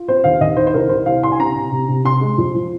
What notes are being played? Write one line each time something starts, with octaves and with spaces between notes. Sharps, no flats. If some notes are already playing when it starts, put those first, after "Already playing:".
Already playing: F4
C4 C5
D#2 F5
D#2 D#5
D#3 C5
C5
C2 A#4
C2 C5
C2 F5
C2 C6
G#5
C3 A#5
C3
C3
C3
C3 C6
G#3
F2
F3